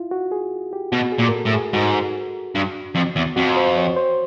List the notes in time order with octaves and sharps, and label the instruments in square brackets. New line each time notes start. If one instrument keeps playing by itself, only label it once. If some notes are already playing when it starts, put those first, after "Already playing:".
Already playing: [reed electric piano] E4 F4
F#4
G#4
G4
[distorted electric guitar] B2 [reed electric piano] F#4
[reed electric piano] G#4
[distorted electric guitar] A#2
[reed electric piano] A#4
A4
[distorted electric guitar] A2
[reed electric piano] G#4
[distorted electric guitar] G#2 [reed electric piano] F#4
[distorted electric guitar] G2
F2
E2
[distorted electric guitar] F2 [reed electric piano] F#4
[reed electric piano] C5
C#5
C5